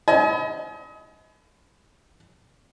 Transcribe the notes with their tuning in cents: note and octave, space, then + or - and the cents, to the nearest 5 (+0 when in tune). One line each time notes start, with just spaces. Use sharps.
D#5 +35 G#5 +35 B5 +25